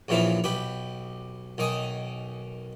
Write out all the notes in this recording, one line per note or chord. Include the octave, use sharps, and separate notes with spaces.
A#1 C#3 E3 F3 E4 F5
B1 G4 B4
B1 D#3 G#5 D#6